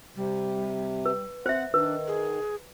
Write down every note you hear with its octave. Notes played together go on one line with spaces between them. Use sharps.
C3 G3
B4
C4 C5 E5 F#5
D#3 D4 B4
G#4